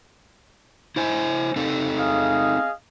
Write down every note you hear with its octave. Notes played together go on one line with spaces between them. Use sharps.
E4 C5 G#5
C4 D#4 A4
G#4 D#5 F5